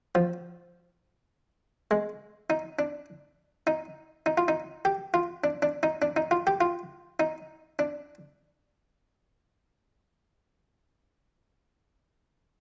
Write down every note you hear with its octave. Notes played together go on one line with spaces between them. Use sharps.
F3
G#3
D#4
D4
D#4
D#4
F4
D#4
G4
F4
D4
D4
D#4
D4
D#4
F4
G4
F4
D#4
D4